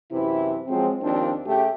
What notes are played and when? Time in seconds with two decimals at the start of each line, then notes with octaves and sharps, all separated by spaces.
0.12 F#2 C3 E3 E4
0.68 F3 F#3 G#3 C4
1.02 D#2 F3 C4 D4
1.46 C#3 A3 G4